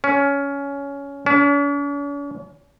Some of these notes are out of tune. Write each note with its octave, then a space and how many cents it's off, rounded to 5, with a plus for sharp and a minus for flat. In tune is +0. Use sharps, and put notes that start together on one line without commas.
C#4 +15
C#4 +45